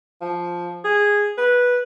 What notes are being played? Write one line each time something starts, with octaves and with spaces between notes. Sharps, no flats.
F3
G#4
B4